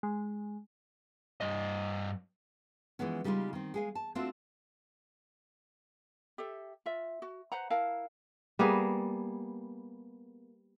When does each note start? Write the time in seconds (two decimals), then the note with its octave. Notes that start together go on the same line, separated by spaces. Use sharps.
0.03 G#3
1.41 G2 D#5
2.99 E3 F3 G#3 B3 C#4
3.24 C#3 G3 G#3 C4 D#4 F4
3.53 D#3 C4
3.74 G#3 G#4 F5
3.95 A5
4.15 A3 C4 D4 F4 F#4 E5
6.38 G4 A4 E5
6.86 F4 E5
7.22 F#4
7.52 B4 C5 F#5 A#5
7.70 E4 A#4 F5 A5
8.59 G3 A#3 B3 G#4